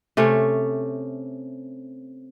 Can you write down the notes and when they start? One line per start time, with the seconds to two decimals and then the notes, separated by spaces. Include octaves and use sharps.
0.17 C3 A3 C#4